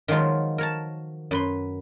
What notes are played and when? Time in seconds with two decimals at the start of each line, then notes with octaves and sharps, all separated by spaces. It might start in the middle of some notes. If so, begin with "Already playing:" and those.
0.08 D#3 F3 F#3 G#3 F4
0.58 A#4 C#5 A5
1.31 F#2 B4 C6